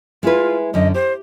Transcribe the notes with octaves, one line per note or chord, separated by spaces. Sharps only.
G#3 E4 F4 B4
F#2 D3 D#5
G4 C5